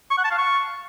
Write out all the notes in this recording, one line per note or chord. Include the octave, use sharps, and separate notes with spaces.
C#6
F#5
A5
F5
C#6